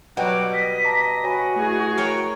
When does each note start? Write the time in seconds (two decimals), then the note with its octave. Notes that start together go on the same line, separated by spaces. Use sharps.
0.17 B2 F#3 G3 F#5 G5 D6
0.54 D#5 B6
0.84 A5 A#5 D6
1.24 F#4 C#5 G#5 B5
1.56 A3 E4 G#4
1.97 A#4 C#5 G5